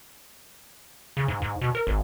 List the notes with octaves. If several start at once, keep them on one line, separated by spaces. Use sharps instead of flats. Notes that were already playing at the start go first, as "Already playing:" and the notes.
C#3
G#2
G#2
B2
A#4
G#1